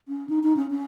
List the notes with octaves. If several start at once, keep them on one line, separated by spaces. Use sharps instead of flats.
C#4
D#4
D#4
C#4
C#4